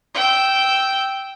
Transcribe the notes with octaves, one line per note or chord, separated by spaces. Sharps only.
G5 E6